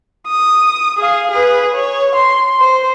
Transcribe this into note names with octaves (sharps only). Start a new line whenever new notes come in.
D#6
G#4 F5
G#4 B4
C#5
C6
C5